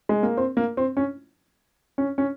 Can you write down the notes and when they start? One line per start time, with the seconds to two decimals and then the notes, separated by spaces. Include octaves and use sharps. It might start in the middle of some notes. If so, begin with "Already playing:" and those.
0.09 G#3
0.23 A#3
0.37 C4
0.57 A#3
0.77 C4
0.97 C#4
1.98 C#4
2.18 C#4